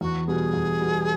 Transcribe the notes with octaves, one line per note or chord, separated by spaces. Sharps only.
E2 F#4
B2 G3 B3 G#4
E2
B2 G3 B3